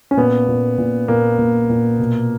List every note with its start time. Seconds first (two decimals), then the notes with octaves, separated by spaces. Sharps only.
0.11 C#4
0.17 A#2 B3
0.48 A#2
0.78 A#2
1.08 A#2 A#3
1.39 A#2
1.69 A#2
1.99 B2